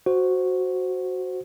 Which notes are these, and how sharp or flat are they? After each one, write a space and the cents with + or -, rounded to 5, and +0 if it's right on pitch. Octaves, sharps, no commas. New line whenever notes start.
F#4 +0 C5 +0